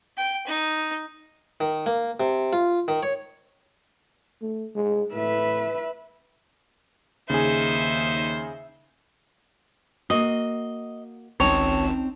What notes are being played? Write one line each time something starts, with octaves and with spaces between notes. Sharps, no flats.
G5
D#4
D#3
A#3
C3
F4
D#3
C#5
A3
G#3
A2 B4 E5
D#2 C#3 D#4 G#4 C5 E5
A#3 F#4 D#5
G#1 C#2 C4 C#4 D#4 C#5 A5